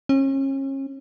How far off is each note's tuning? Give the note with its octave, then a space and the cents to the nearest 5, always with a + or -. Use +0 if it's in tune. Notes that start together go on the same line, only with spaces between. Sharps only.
C#4 -35